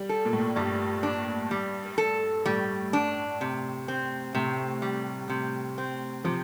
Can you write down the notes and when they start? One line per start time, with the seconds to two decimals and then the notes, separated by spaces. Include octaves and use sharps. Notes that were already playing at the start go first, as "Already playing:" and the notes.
Already playing: G3
0.09 A4
0.25 A#2
0.33 A2
0.39 A#2
0.56 G2 G3
1.03 D4
1.51 G3
1.98 A4
2.46 A2 G3
2.93 D4
3.41 C3
3.88 C4
4.35 A2 C3
4.82 G3
5.29 C3
5.78 C4
6.24 C3 F3